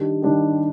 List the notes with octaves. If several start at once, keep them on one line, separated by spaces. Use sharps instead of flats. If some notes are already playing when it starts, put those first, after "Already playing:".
Already playing: D#3 G3 D4 G4
D#3 G3 D4 G4